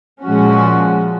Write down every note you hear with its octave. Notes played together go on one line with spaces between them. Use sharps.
A#2 F3 G#3 C#4 F#4